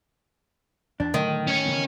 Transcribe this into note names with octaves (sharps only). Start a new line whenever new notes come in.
E2 D4
A2 D3 D#3 F#3 A3
C#4 C#5
C#3 E3 B3